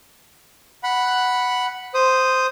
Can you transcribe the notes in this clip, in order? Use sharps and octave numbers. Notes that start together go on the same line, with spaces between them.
F#5 B5
C5 D#6